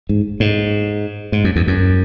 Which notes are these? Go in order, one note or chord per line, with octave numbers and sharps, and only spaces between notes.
G#2
G#2
G#2
F#2
E2
F#2